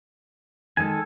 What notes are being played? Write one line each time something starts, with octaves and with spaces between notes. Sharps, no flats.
D#3 G#3 A4 G#5